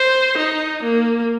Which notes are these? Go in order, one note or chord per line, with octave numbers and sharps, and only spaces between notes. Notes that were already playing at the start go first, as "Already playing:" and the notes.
Already playing: C5
D#4
A#3